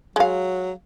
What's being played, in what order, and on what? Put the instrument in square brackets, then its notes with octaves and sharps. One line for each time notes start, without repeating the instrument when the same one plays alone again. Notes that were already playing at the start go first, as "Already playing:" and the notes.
[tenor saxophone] F#3 [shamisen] G#3 F5